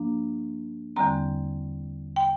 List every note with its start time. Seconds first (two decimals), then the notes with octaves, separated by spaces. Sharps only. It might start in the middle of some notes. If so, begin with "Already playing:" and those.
Already playing: G2 F3 A#3 D4
0.96 E2 D3 G3 C4 A#5
2.16 G5